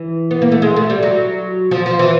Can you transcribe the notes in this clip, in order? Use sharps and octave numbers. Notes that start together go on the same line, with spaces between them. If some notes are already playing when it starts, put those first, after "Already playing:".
Already playing: E3
B3
A#3
A3
G#3
A3
G3
F#3
F3
F3
E3